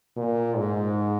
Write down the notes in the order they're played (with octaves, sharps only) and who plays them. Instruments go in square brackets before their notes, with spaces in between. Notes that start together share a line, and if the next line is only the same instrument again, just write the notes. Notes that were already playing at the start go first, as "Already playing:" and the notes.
[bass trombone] A#2
G#2